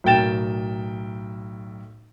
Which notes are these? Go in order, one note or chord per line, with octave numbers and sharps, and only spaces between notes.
B1 A2 A#4 G5 A6 E7